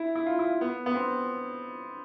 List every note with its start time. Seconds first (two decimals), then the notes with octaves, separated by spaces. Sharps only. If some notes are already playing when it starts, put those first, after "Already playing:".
Already playing: E4
0.16 E4
0.26 F4
0.39 E4
0.44 F4
0.61 B3
0.86 B3
0.95 C4